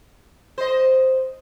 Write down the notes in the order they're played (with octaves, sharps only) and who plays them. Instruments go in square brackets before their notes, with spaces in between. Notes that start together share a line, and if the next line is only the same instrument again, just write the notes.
[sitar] C5 D#5